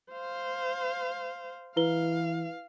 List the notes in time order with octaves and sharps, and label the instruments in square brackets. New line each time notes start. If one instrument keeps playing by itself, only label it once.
[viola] C5 F5
[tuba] E3 [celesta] E4 B4 G7 [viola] F5